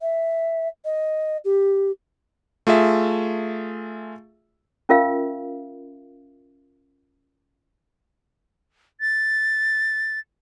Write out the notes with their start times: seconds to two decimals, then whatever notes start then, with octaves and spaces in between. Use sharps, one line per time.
0.01 E5
0.85 D#5
1.45 G4
2.67 A3 F4 G#4 E5
4.89 C#4 F4 A#4 E5 F5
9.01 A6